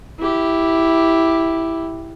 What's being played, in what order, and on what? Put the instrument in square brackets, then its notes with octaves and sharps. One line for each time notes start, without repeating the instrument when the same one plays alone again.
[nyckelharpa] E4 G4